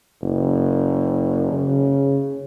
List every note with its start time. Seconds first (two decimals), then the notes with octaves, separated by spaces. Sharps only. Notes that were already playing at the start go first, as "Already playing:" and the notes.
0.22 F#1
1.52 C#3